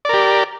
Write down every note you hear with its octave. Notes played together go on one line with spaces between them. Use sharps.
G4 A#4 D5